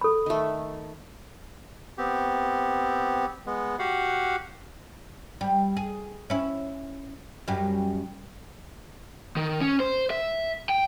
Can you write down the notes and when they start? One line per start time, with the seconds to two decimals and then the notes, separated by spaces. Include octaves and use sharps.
0.01 A4 B5
0.26 D#3 A3
1.98 B3 C4 G4
3.46 G#3 B3
3.79 F#4 G4 F5 F#5
5.41 G3
5.77 G#4
6.30 C#4 E4
7.48 F#2 G3
9.36 D#3
9.61 C#4
9.80 C5
10.10 E5
10.69 G5